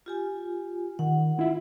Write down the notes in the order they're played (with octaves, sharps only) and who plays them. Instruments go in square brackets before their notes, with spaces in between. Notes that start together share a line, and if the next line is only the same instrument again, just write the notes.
[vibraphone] F4 G4 G#5
[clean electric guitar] D#3 [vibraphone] F#5
[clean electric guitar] E4 F4 E5